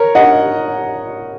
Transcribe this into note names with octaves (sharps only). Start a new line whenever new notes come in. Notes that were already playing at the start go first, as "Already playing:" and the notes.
Already playing: A#4 C#5
D#5 F#5